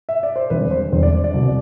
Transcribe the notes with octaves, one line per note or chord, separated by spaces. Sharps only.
E5
D5
C5
E1 E2 D3 G3 C4 B4
C5
E1 E2 D3 G3 C4 C5
D5
D5
C2 B2 F#3 C4